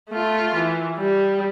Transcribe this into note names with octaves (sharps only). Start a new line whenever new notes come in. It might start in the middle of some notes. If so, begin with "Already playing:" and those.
A3 F4
E3
G3